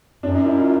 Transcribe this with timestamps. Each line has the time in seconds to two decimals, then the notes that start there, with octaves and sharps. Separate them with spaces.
0.23 F#2 D4
0.34 D#4
0.46 E4
0.57 F4